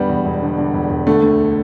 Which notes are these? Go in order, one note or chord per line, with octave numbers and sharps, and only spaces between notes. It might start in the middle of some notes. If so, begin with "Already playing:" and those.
Already playing: E1 D3 G3 B3
E2
E1
D3
D3
E1
E1
D3 A3
D2